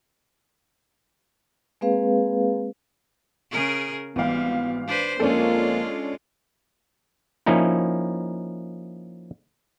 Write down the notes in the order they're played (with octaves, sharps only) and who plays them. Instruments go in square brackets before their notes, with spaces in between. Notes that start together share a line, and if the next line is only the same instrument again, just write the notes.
[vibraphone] G#3 A#3 C4 G#4 B4 F5
[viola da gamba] C#3 G#4 A#4
[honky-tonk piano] G#1 E3 F5 [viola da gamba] G3 [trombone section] B3
[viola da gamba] D4 B4 C5
[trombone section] F2 F3 A#3 [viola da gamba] G#3 F4 [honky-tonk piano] C#4 D4 A4
[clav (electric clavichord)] F3 A#3 C#4 D#4 E4